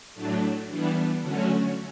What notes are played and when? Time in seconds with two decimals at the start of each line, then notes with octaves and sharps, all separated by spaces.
0.14 A2 F#3 A3 D4
0.68 E3 G3 B3 D4
1.21 D3 F#3 A3 C#4 F#4